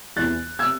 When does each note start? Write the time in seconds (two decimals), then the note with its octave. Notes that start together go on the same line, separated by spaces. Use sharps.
0.16 E2 C3 E3 F#6 A6
0.59 C3 E6 G#6